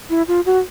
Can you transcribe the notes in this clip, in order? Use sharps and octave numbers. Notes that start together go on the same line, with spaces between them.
E4
F4
F#4